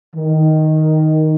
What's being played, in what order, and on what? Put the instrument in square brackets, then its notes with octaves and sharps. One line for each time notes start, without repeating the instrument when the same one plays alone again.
[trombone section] D#3